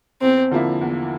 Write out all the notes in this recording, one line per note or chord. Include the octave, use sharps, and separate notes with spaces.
E2 C4
D3 F3 A#3 E4
E2